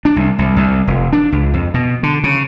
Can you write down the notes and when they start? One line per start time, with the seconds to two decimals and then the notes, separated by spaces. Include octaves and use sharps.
0.05 D4
0.16 C2
0.39 C2
0.56 C2
0.87 F1
1.13 D4
1.32 C#2
1.54 F2
1.74 B2
2.03 D3
2.24 C#3